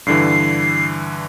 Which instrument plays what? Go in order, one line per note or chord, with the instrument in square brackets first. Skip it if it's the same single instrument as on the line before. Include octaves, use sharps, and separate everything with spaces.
[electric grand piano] G2 D3 E3 [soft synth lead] C7